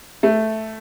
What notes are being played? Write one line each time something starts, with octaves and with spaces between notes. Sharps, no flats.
A3